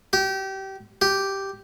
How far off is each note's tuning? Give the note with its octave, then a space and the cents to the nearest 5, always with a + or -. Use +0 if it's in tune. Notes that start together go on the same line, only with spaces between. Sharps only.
G4 -25
G4 -5